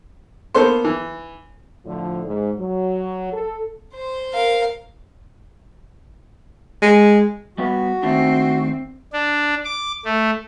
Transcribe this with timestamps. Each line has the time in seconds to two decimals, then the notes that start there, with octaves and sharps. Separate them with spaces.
0.55 A#3 B3 A4 C5 C6
0.85 E3
1.85 A2 D3 F3
2.26 G#2
2.58 F#3
3.32 A4
3.95 C5 C6
4.34 A#4 F5
6.82 G#3
7.58 G3 B3 F#4 B4
8.03 D#3 A3 C4 D4
9.13 D4
9.65 D6
10.05 A3